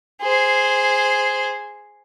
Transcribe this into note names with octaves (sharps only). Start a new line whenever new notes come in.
G#4 C5